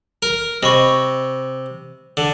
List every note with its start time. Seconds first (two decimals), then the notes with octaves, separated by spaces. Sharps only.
0.22 A#4
0.63 C3 D#5 B5 C#6
2.17 D3